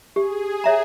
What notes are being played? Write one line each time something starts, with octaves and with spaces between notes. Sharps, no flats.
G4 G#4
C#5 E5 A#5